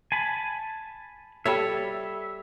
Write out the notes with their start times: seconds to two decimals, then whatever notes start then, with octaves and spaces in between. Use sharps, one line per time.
0.12 G#5 A5 B5
1.46 G3 A4 C#5 E5